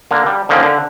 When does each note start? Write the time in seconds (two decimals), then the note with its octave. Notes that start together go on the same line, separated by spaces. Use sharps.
0.11 D3 A#3
0.26 G3
0.49 D3 D#3 F3 A#3 C#4
0.63 D3